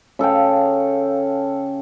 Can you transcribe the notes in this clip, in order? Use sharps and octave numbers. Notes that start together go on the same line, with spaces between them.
C#3 A4 F5 G5